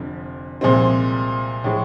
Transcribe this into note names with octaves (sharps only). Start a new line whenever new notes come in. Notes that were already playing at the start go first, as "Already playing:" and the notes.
Already playing: F1 F2 D3 F3
C2 A#2 F3 G#3 C4
A2 F3 G#3